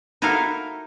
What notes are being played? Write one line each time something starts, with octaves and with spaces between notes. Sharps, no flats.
D#4 E4 F#4 A4 A#4 F5